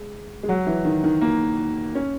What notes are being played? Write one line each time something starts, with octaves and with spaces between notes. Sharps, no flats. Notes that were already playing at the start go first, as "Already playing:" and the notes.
Already playing: G#3
G#3
F#3
E3
D#3
D#3
A#3
C#4